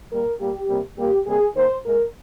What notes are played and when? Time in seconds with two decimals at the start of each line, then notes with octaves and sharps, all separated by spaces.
0.11 A#2 G3 A#3 A#4
0.40 A#2 G3 A#3 G4
0.69 C3 G3 A#3
0.97 A#2 G3 A#3 G4
1.26 C3 G3 A#3 G#4
1.55 D#3 A#3 C5
1.84 A#2 G#3 A#4